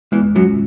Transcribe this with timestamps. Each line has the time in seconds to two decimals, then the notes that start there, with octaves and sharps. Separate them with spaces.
0.12 E2 E3 G#3
0.35 F#2 F#3 C#4 F4